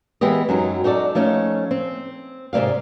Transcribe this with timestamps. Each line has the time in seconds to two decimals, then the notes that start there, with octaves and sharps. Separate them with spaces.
0.21 E3 G#3 B3 G4 D#5
0.49 F#2 F#3 D#4
0.84 D#4 F#4 A4 D5
1.15 F3 A3 C#4 D#4 A4
1.71 C4
2.53 G#2 C3 A#3 D5 F5